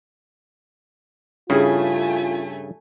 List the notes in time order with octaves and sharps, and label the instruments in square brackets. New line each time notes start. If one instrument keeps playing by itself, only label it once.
[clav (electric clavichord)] G2 C#3 [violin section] A3 G#5 [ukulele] C#4 E4 G#4 [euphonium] F4